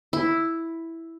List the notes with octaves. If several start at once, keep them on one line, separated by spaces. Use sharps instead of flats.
E4